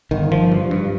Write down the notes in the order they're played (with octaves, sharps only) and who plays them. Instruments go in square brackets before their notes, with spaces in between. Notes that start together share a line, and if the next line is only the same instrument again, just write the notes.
[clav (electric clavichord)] G1 [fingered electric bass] D#3
[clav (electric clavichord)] F3
G2
G2